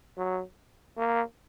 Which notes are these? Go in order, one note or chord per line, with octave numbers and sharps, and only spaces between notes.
F#3
A#3